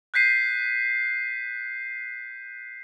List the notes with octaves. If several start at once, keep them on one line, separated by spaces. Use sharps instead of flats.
F#6 G6 B6 C7 D#7